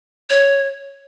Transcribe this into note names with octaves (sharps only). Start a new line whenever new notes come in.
C#5